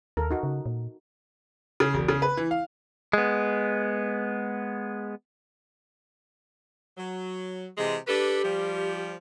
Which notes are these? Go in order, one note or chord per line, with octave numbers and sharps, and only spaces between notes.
D#2 A4 A#4
D#4 F#4
C#3
A#2
C#3
E1
C#3
B4
E3
F5
G#3 B3
F#3
C3 E3 G#3
D4 G4 A4 B4
F3 G3